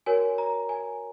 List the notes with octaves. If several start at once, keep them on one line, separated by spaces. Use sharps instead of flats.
F#4 A#4 C#5 G#5
A#5
G#5